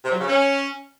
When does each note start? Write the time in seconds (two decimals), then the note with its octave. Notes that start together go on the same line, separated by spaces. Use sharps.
0.03 C3
0.11 F#3
0.19 C#3
0.27 C#4